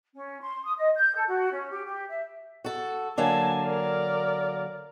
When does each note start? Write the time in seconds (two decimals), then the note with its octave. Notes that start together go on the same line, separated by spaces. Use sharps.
0.14 C#4
0.40 C6
0.63 D#6
0.77 D#5
0.95 G6
1.15 A4
1.27 F#4
1.51 C#4
1.70 G4
1.85 G4
2.09 E5
2.64 F#4 A4
3.18 D3 F#3 A#3 G#5 A5
3.62 A#4 D5